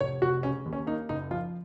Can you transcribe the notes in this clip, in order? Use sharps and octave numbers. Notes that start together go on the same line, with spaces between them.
F1 C#5
F1 F#4
C#3 C#4
D#2
C#4
A#3 D#4
F#1 D#4
F3 F4